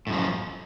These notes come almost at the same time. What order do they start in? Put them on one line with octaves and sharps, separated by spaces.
A2 F#2 F3